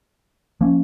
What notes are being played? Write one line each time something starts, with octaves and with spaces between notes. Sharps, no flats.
F3 A#3 C#4